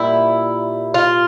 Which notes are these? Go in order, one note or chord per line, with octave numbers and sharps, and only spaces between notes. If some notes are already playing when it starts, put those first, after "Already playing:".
Already playing: A#2 G3 E4
F4